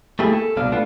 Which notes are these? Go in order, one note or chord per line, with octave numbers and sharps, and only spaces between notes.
A3 A#3 E4 G4 G#4
A4
C2 B2 D4 F5
A3 B3 D4 F4